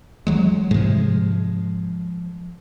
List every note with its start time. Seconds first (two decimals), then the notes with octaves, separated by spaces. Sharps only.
0.27 E3 F#3 G#3
0.71 G#2 C3 F3 G#3